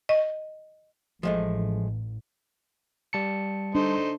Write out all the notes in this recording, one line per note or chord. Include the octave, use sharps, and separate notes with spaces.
D#5
A1 F3 G#3 A3
G3 A5 C#7
A3 D4 D#4 C5